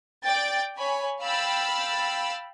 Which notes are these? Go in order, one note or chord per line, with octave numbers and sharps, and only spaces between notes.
D5 G5 A6
C#5 G#5 B5
F5 G5 B5 E6 A6